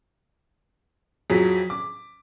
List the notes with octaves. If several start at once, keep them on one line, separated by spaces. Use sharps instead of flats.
F2 F#3 G#4 B6
D6